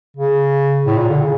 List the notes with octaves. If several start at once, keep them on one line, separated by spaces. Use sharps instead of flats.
C#3
A2
A#2
D3
C#3